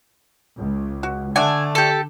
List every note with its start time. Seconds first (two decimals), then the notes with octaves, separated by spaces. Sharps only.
0.57 C#2
1.03 F#4
1.36 D3 A3 D4 F#5 G#5
1.75 G4 A4